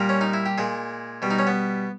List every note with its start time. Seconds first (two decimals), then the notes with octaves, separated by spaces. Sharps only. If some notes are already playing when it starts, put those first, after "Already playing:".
Already playing: A#2 G3 A#4
0.09 C#4
0.21 D#4
0.34 E4
0.46 G4
0.58 A#2 G#3 G#4
1.22 B2 G3
1.30 D#4
1.39 C#4
1.47 B3